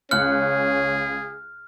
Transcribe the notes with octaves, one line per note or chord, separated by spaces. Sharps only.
C#2 C#4 G#4 F6 F#6 C#7